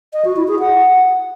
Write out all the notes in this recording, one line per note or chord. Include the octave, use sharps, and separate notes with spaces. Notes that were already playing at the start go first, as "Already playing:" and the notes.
D#5
F#4
E4
G#4
F#5